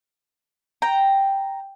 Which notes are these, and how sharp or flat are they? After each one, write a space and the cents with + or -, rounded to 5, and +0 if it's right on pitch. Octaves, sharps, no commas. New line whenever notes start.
G5 +0 A#5 +0